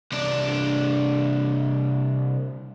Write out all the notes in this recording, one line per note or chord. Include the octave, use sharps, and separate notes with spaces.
C2 D4